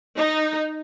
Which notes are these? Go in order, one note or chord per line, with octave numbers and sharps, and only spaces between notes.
D#4